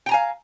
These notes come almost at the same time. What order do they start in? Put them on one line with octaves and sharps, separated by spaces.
G5 A#5 G#5 F5